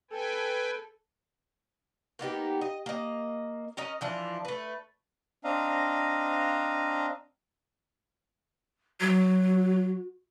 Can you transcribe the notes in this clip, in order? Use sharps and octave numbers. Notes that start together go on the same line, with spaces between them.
A4 B4 G5 G#5
A#3 B3 D#4 G4
D#5
A#3 D#5
C#4 A#4 D#5
E3 F3 D4
A3 B4
C4 D4 D#5 F5 A#5
F#3 F#4